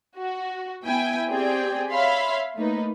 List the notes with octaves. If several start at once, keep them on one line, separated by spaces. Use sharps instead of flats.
F#4
B3 E4 G5 G#5
C4 G4 G#4 D5 G5
C#5 E5 F5 B5 C6
A3 A#3 D#4 B4